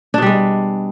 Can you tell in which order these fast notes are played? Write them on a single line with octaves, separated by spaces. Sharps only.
D4 B2 G3 G#3